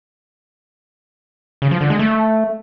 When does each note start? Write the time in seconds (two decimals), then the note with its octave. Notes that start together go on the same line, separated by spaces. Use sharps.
1.62 C#3
1.71 F3
1.81 D3
1.90 G#3
1.99 A3